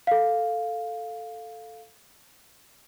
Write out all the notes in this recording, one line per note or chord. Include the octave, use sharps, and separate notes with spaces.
A4 F5